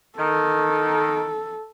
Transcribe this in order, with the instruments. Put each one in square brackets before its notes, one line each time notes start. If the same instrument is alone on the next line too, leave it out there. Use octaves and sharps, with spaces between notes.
[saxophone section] D#3 [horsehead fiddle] A4